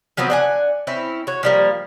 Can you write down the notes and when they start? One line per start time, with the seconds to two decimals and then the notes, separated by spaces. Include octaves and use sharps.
0.17 F3 F#3 B3 C4
0.30 D4 F#5 G#5
0.87 C4 C#4 E4
1.27 F#4 C#5
1.43 F3 G3 A#3